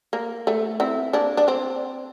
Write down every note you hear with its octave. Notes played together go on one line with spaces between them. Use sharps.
A#3
A3
C4 E4
A#3 D4
D4
C4